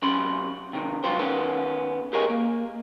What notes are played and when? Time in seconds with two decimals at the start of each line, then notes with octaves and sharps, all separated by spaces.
0.02 F#2 C3 C#4 B5 C6
0.73 C3 D#3
1.04 G2 C3 F#3 B3 F4 C5
1.19 D#3 B3 C#4 A4
2.13 G4 G#4 A#4 C#5 D#5 G#5
2.30 A#3